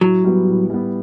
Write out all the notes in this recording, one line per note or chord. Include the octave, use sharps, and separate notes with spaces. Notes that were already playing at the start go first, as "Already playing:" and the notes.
A2 F#3
G3 B3
A2
G3 B3